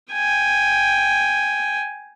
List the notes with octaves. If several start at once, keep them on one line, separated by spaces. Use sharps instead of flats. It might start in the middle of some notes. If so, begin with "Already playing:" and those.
G5 G#5